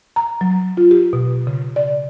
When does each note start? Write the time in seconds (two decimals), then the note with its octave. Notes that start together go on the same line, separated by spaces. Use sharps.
0.16 A#5
0.41 F#3
0.77 F4
0.91 G4
1.13 B2
1.47 C#3
1.76 D5